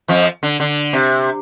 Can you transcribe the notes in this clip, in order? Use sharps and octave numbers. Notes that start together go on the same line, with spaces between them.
F2 F3
D3
D3
C3